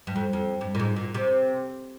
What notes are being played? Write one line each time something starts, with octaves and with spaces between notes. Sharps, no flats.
G2
F2
F2
G2
A#2
G#2
A#2
C3